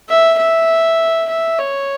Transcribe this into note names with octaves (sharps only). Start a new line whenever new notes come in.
E5
E5
E5
C#5